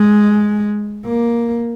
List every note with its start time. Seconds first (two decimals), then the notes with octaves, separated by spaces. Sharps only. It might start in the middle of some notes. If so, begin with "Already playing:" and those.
Already playing: G#3
1.05 A#3